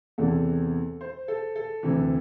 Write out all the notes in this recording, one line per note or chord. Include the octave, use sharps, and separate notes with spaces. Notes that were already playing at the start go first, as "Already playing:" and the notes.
E2 C3 E3 A4
C5
A4
A4
D2 C3 E3